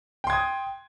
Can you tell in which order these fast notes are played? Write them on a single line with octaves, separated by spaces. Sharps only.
G5 C6 G#6 D#6